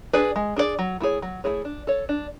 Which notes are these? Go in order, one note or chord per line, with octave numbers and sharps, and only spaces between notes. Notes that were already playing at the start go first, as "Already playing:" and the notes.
D4 G#4 B4 D5
G#3
D4 G#4 B4 D5
F#3
A3 E4 G#4 C#5
F#3
A3 E4 G#4 C#5
D4
A4 C#5
D4